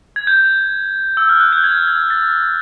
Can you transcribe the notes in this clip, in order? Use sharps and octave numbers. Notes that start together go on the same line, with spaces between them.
G#6
G6
E6
F6
F#6
G6
G#6
G#6
A6